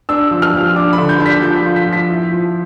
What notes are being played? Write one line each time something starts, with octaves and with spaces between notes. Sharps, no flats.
D4 E6
F3
F6
F3
D4 D6
B5
D3
G6
D4
B6
F3 G6
F4
B6
F3
B6
E4
F3